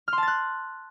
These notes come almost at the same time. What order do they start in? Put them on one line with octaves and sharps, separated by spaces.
F6 C6 A5 A6 F#6